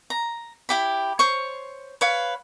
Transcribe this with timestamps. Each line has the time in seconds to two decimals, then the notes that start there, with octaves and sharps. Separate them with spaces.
0.10 A#5
0.69 E4 G4 B5
1.19 C5 C#5 C#6
2.01 B4 C#5 F5